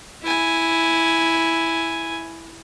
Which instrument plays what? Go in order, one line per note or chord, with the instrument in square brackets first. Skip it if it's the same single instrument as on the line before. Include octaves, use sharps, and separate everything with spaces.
[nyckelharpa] E4 G#5